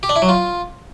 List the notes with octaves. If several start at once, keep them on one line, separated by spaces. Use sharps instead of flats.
G4
D4
E4
F#3
F4